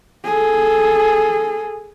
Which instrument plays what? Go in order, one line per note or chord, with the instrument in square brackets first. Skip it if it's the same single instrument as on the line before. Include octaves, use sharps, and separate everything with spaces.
[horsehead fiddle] G#4 A4